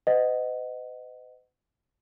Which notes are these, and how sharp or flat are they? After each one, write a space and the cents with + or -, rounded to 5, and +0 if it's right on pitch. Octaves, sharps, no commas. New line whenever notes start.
B4 +45 D#5 -5 F#5 +5